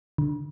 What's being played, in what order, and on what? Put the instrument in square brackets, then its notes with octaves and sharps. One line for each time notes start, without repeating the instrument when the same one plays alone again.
[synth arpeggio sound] D3